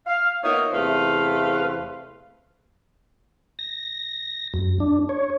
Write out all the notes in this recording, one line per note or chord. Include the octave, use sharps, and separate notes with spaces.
F5
A#3 B3 D#4 F4 C#5 E5
E2 C3 A3 B4 C5 F5
A#6
F#2
D4
C#5